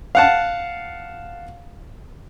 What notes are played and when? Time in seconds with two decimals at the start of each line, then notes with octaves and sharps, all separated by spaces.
0.15 F5 F#5 A5